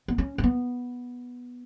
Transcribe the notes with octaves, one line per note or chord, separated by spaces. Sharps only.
B3
C#4
C#4
B3